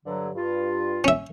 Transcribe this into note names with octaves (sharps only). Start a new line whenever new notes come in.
G2 D3 F#3
G2 F4
C#4 E5